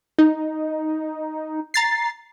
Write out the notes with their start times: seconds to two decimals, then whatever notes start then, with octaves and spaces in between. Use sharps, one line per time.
0.19 D#4
1.74 A#5 A6 C7